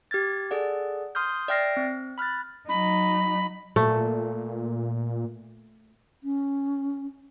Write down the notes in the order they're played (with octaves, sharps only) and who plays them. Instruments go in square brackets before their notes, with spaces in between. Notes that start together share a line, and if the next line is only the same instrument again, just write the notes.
[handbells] G4 F6 G#6 A6
G#4 A4 D5 F#5
C6 D#6 F6 G6
D5 E5 G5 F6 A#6 C7
C4
B5 F6 F#6 A6
[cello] F#3 D#4 [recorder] B5
[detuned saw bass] A#2 [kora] A3
[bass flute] C#4